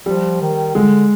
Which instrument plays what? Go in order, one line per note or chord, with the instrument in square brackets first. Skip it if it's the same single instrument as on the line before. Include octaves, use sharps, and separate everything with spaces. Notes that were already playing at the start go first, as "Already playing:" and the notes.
[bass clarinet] F3 [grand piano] G3
[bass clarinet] D#3
[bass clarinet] D3 [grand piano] G#3